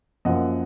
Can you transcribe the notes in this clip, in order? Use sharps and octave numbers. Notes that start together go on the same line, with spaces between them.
F#2 F3 A#3 D#5 F#5